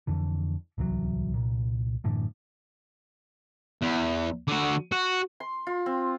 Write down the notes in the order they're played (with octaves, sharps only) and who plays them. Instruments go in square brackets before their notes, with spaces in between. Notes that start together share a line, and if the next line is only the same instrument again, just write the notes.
[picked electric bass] F2 D3 E3
D1 C2 E3 F#3
C2 A#2
F#2 A2 D3 E3
[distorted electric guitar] E2
D3 F#4
F#4
[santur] C6
F4
C4